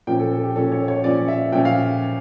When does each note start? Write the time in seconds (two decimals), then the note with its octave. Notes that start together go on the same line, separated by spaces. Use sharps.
0.07 A#2 F3 C#4 G5
0.20 A4
0.31 A4
0.43 G4
0.56 A#2 F3 C#4 A4
0.72 C#5
0.88 C#5
1.04 A#2 F3 C#4 D5
1.28 E5
1.52 A#2 F3 C#4 G5
1.65 F5